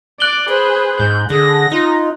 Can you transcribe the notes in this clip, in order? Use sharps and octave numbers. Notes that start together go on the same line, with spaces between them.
D5 D6 F#6 F#7 G7
G#4 B4 C5
G#2 G6
D3 G#4 A#6
D#4 F4